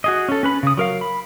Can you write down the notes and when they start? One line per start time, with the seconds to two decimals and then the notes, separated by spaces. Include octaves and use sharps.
0.04 F#4 G#4 D#5
0.28 C#4 A4
0.43 C#4 B4 B5
0.63 C#3 D#6
0.77 F#3 A#4 F5
1.01 B5